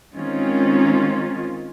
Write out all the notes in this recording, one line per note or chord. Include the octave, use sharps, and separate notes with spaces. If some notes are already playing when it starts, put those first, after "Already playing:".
D#3 G#3 C4 C#4 D#4 F4